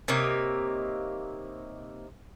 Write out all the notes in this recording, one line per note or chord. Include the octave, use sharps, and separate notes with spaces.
C3 A#3 D#4 C#5